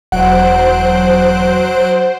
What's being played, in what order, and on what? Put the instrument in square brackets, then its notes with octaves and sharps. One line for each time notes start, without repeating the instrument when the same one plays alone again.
[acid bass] E1 [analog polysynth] F#3 F#6 D7 [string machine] C5 [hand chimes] F#5